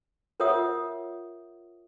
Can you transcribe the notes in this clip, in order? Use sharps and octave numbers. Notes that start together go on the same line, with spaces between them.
F4 A#4 C#5 E5 F#5 D#6